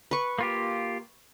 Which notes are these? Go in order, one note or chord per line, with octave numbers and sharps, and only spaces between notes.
B4 C#6
A#3 F4 G4